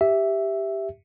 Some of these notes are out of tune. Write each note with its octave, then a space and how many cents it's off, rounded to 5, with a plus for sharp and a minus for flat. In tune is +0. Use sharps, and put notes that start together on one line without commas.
G4 +0 E5 +0